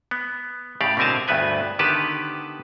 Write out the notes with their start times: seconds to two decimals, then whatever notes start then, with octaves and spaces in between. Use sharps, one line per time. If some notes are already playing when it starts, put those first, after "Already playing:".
0.11 B3
0.81 A2 C#3 G4 D5 F5
0.97 B2 D3 C4 A#4 G#5 A5
1.28 D2 G2 A3 B3 B4 G#5
1.79 D3 D#3 B3 G4 B4 A5